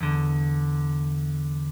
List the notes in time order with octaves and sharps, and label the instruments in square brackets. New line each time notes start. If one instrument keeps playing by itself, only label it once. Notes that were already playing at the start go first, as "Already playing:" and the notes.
[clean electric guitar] E2 D3